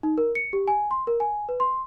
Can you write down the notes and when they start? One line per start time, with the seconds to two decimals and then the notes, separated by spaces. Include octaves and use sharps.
0.03 D#4
0.18 A#4
0.35 C#7
0.53 G4
0.68 G#5
0.91 C6
1.07 A#4
1.20 G#5
1.49 B4
1.60 C6